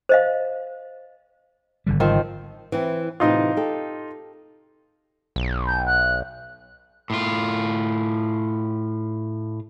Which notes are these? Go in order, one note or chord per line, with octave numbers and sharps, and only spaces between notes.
C5 D#5 F5
G#1 D3 G3
D#3 F3 C4
E3 C4 E4
A2 C3 E3 D#4 F4
G4 A4
B1
G6
F#6
A2 F4